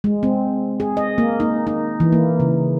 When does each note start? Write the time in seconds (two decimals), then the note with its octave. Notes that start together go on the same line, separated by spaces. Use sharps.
0.04 G#3
0.23 C4
0.80 G#4
0.97 D#5
1.18 A#3
1.40 D#4
1.67 D#4
2.00 E3
2.13 A#3
2.40 C#3